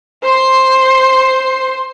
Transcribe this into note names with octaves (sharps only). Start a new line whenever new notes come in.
C5 C6